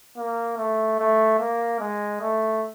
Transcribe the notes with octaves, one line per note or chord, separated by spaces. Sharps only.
A#3
A3
A3
A#3
G#3
A3